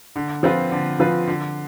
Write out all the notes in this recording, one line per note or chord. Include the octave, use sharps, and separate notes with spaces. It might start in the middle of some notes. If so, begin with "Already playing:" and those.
D3
F3 C4 F4 B4
D3
F3 C4 F4 B4
D3